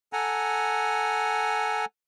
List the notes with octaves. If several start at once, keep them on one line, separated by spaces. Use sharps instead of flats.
A4 F#5 G#5 A#5